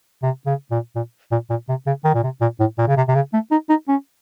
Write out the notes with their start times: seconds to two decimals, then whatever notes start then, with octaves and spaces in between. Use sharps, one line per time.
0.23 C3
0.46 C#3
0.71 A#2
0.96 A#2
1.32 A#2
1.50 A#2
1.69 C3
1.87 C#3
2.04 D#3
2.15 A#2
2.23 C3
2.41 A#2
2.60 A2
2.78 A#2
2.88 C#3
2.97 C3
3.08 C3
3.15 C#3
3.33 A3
3.51 D#4
3.69 D#4
3.88 C#4